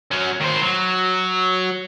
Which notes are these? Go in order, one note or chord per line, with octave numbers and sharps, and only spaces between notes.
F#3 C#4
D#3 C5
F#3